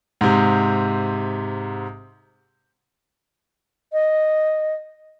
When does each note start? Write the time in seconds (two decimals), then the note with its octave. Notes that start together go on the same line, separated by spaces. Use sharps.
0.21 G#2 C3
3.93 D#5